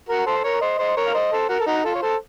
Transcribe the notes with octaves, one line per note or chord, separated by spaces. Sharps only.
F#4 A#4
A4 C5
A#4 C#5
C5 D#5
C5 D#5
A#4 C#5
F5
C5 D#5
A4 C5
F#4 A#4
A4
D#4 F#4
F4 A4
C#5
A4 C5